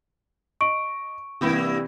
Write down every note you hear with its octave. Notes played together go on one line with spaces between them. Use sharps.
D#5 C#6 D7
G2 C3 E3 A#3 E4